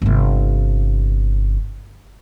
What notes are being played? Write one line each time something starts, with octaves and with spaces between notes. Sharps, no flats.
G1 C3